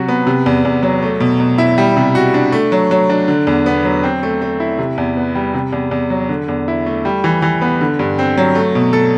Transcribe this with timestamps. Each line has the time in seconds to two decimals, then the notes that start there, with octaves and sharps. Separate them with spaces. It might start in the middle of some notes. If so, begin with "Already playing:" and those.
Already playing: C3 F#3 F#4
0.08 B3
0.27 C3
0.46 E2
0.65 E2
0.83 F#3
1.02 A3
1.20 B2
1.40 B2
1.58 E4
1.78 G3
1.97 C3
2.15 F#4
2.34 D4
2.52 A3
2.72 F#3
2.91 F#3
3.10 D4
3.28 D3
3.47 E2
3.66 B3
3.85 F#3
4.03 C4
4.23 A3
4.42 A3
4.60 E4
4.78 C3
4.98 E2
5.17 B3
5.35 G3
5.54 C3
5.73 E2
5.91 E2
6.10 F#3
6.29 D3
6.48 E2
6.68 E4
6.86 A3
7.05 G3
7.24 E3
7.42 E3
7.62 B3
7.81 D3
7.99 G2
8.19 C4
8.37 F#3
8.55 A3
8.75 B2
8.93 A4